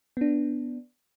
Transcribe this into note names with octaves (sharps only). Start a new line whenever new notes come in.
B3 D4